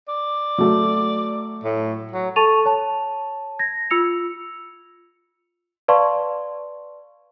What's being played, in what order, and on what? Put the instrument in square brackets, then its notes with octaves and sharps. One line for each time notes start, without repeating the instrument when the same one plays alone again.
[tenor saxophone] D5
[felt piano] F#3 A3
[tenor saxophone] A2
F#3
[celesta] A4 A5 C#6 A6 D#7 F7
C#5 A5
G#6 A#6
F4 E6 C#7 F7
B4 D5 F5 A5 C6 C#6